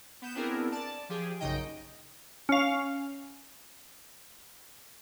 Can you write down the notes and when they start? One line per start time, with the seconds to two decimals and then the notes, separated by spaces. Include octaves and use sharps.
0.22 B3 G6 E7
0.35 B3 C4 D4 E4 G#4 A#4
0.71 D5 A5
1.09 F3 G4 G#4
1.40 A#1 F#2 C#3 D#4 D#5 G5
2.49 C#4 F5